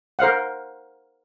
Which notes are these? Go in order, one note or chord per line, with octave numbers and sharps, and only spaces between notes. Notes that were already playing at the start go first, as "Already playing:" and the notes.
A#4 C5 F5 F#5